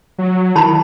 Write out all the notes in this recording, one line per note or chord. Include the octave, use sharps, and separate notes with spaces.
F#3
D#3 E4 A5 B5